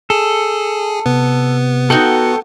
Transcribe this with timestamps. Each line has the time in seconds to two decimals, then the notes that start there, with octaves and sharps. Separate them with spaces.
0.10 G#4 A4
1.06 C3 B3
1.90 D#4 F#4 A4 G5